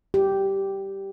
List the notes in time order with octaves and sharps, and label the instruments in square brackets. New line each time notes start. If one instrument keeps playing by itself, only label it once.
[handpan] G4